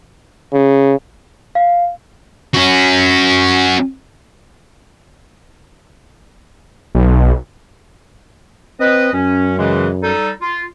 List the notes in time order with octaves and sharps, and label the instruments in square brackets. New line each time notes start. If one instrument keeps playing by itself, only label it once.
[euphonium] C#3
[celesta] F5
[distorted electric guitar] C#4 F#4
[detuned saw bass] B1
[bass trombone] C4 [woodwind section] B4 D#5
[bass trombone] F#2 [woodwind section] C#4
[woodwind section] C#3 E3 G#3
G3 D#4 A4
F4